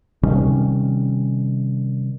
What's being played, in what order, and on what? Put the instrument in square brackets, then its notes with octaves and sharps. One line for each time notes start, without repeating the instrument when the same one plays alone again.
[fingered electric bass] C3 D#3 G3 C#4